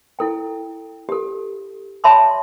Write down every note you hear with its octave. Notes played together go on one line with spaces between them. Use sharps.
E4 A4 G5
G4 A4
C#5 E5 A5 B5 C6 D6